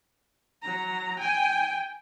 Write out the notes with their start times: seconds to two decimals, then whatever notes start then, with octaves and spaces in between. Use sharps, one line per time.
0.63 F#3 A#5
1.19 G5 G#5